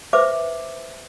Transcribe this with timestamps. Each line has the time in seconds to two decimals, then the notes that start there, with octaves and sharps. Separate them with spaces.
0.13 B4 C5 E5 D6